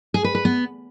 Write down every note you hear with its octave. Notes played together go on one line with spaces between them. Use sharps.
G#4
B4
B4
B3